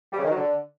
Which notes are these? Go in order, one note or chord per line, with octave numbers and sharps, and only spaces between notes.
G3
C#3
D#3
F#3
D3